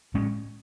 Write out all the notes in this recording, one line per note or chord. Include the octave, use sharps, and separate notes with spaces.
A2 G#3 C#4